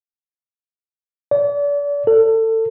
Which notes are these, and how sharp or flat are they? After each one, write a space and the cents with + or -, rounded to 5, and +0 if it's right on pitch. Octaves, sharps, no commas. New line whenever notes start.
D5 -35
A4 +25